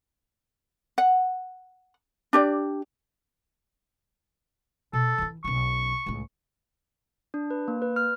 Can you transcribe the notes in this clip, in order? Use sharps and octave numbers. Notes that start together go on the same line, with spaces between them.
F#5
D4 G4 D5
B2 A4
E3 E4
B1 C#4 C#6
C#2 A2
D4
B4
A#3
B4
F6